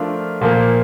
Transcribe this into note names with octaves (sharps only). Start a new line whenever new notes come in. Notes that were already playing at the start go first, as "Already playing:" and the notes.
Already playing: F3 A3 D4 F4 A#4
A#2 F3 A#3